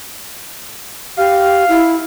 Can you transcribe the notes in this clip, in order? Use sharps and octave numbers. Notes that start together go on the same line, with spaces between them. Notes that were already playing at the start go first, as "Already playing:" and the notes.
G4 F5
E4